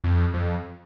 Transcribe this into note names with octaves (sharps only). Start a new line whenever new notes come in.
F2
F2